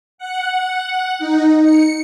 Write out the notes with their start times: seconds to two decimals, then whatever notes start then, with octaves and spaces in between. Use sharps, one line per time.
0.18 F#5
1.19 D#4
1.62 C#7